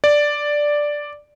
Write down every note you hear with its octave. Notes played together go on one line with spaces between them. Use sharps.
D5